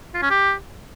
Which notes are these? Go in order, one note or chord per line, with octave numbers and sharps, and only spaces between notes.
F4
C#4
G4